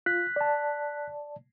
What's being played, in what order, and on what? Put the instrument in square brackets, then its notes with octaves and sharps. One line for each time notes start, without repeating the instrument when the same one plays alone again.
[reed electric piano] F4 [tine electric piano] F#6 B6
[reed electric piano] D5 A5